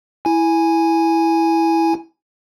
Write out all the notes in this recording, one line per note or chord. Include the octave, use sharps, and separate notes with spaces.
E4 G#5